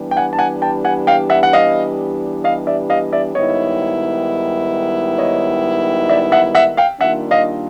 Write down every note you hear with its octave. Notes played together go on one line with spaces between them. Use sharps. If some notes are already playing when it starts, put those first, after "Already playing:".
Already playing: E3 G3 B3 D4 G4
G5
F#5 G#5
A5
F#5 G#5
G5 A5
F#5 G#5
F5 G5
E5 F#5
F#5
D#5 F5
D#5 F5
D5 E5
D#5 F5
D5 E5
G#2 D#3 G3 B3 E4 C#5 D#5
C#5 D#5
D5 E5
E5 F#5
E5 F#5
F5 G5
D#3 G3 A#3 D4 F4 E5 F#5
D#5 F5